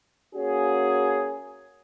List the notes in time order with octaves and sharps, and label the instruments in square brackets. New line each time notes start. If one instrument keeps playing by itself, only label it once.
[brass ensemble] A#3 C#4 F#4 G#4